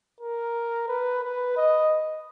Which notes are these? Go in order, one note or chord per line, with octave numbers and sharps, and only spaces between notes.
A#4
B4
B4
D#5